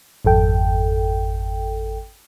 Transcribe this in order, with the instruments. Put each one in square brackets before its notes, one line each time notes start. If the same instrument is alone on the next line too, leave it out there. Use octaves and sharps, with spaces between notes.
[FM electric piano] G#1 F2 A4 G5